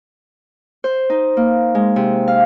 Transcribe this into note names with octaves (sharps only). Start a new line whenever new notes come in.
C5
D#4
A#3
G#3
C3
F5